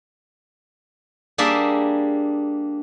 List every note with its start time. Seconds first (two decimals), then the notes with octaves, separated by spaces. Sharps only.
1.38 G3 A#3 D4 G#4 E5